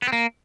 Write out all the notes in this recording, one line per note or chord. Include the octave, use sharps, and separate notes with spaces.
B3
C4
A#3